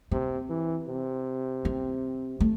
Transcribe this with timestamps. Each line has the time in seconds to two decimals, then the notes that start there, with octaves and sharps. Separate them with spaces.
0.11 C3 C4
0.49 E3
0.88 C3
1.65 C4
2.40 A3